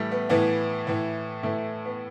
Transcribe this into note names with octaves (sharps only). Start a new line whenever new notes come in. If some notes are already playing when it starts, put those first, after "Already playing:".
Already playing: A2 E3 G3 A3
B3
A2 E3 B3
A2 E3
A2 E3 A3
B3